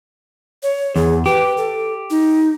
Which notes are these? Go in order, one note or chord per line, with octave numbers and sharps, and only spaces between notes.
C#5
E2 G#4
G4 B4
A4
D#4